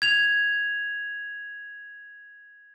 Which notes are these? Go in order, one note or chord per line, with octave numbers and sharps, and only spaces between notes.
G#6 F7